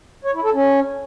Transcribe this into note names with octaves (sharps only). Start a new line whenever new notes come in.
C#5
E4
A4
C#4